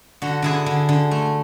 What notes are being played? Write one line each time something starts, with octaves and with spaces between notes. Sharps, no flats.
D3 F#4
D3 E4 G#4
D3
D3
A3